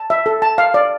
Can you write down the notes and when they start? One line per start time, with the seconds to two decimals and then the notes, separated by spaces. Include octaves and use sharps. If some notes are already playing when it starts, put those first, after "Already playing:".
Already playing: A5
0.10 E5
0.26 A4
0.42 A5
0.58 F5
0.74 D5